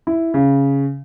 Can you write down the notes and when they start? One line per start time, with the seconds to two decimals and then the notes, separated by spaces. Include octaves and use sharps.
0.07 E4
0.34 C#3